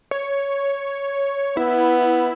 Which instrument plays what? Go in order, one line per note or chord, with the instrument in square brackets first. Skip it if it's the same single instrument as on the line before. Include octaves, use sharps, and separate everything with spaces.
[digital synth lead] C#5
[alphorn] B3 [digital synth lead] E4